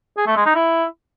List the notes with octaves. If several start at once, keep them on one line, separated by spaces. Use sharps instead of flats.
G#4
A3
G#3
D#4
E4